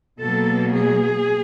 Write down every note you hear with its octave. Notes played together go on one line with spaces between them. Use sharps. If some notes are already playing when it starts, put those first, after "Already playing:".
B2 F#3 A#3 A4
G#4